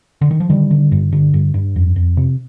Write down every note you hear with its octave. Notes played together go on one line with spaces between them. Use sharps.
D3
D#3
F3
D3 D#3 G3
D3
G2
D3
G2
G2
F2
F2
C3